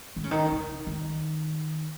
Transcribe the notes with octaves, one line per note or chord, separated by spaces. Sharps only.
D#3
C#3
D#3
C#3
D#3